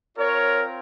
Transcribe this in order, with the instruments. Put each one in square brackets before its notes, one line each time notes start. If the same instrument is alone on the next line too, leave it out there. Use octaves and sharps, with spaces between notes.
[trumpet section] C4 F4 A#4 C#5